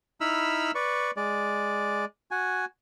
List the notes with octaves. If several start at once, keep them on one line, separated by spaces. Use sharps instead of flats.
D#4 E4 B5 E6 F6
B4 D5 C#6
G#3 D5
F#4 G#5